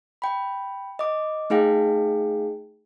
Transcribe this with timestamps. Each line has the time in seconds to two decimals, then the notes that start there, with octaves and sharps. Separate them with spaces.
0.22 G5 B5
0.99 D#5 D6
1.50 A3 D#4 G#4 F5 G5